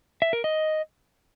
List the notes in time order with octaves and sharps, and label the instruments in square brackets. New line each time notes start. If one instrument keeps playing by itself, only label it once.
[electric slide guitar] E5
A#4
D#5